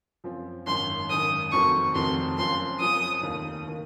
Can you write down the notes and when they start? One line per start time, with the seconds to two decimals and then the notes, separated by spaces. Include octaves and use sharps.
0.24 F#2 F3 C4 F4
0.66 G#1 F#2 D#3 C6
1.09 G#1 F#2 D#3 D#6
1.52 F1 F2 D#3 F#3 C4 C#6
1.95 F1 F2 D#3 F#3 C4 C6
2.38 F#1 F#2 F3 C4 F4 C6
2.80 F#1 F#2 F3 C4 F4 D#6
3.23 F1 D#2 D#3 A#3
3.67 D#3 A#3